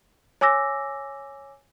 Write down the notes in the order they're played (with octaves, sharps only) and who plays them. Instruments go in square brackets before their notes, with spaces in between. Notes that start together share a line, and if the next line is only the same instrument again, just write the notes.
[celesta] C#5 G#5 D6 E6 A#6